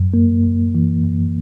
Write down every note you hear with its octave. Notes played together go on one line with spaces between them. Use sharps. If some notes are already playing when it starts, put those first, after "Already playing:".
Already playing: F#2
A#3
F#2
E3
F#2